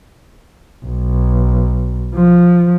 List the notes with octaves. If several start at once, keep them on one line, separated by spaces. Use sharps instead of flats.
B1
F3